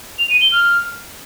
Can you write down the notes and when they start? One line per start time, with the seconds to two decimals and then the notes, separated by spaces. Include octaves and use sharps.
0.19 F7
0.30 D#7
0.41 G7
0.52 F6